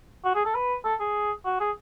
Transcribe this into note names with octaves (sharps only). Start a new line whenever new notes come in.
F#4
G#4
A4
B4
A4
G#4
F#4
G#4